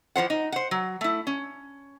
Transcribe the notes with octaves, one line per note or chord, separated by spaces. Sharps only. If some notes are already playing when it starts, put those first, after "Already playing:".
E3 F3 C5 F#5
D#4
C5 F#5
F#3
A3 E4
C#4